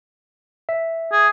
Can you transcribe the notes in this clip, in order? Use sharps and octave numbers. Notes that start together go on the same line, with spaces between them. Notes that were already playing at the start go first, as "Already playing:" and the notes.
E5
G#4